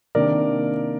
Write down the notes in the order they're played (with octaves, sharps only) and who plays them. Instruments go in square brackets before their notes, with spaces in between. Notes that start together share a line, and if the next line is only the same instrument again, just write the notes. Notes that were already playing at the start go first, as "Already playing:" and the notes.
[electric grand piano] C3 D#3 A#3 D4 A#4 D5